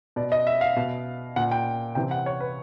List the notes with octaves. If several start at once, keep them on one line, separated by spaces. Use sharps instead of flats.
B2 D5
D#5
E5
F5
B2
A#2 F#5
G5
C3 E3 G5
F#5
C#5
B4